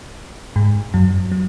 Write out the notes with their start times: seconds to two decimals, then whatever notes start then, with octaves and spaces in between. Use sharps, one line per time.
0.56 G#2 G#3
0.94 F#2 F#3
1.32 F#3